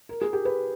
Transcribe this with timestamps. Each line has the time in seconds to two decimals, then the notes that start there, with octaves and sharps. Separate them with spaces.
0.09 A#4
0.22 G#4
0.33 G4
0.45 B4